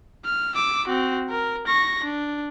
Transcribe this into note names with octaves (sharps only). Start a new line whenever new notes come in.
F6
D6 E6
C4 F#4
A#4
C#6 A#6
D4